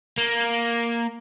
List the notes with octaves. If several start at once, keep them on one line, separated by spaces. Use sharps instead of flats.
A#3